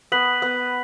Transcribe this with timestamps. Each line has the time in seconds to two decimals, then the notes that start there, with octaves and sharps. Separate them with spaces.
0.12 B3 F#6 B6 F#7
0.42 B3